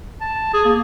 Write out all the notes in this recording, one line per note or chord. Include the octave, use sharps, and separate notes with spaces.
A5
G#4
A#3